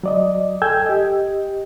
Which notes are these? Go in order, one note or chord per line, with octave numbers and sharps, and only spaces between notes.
F#3 D5 D#5
A4 G5 G#5 E6 G6 G#6
G4 D#5